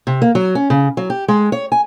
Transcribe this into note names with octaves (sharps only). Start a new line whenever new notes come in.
C3
A#3
F#3
C#4
C#3
F#3
G4
G#3
C#5
G#5